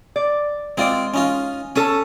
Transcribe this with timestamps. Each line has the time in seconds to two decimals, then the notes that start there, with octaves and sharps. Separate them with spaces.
0.16 D5
0.77 G#3 C4 F4 D5
1.14 C#4 D#4 F4
1.76 C#4 A4 C#5 D#6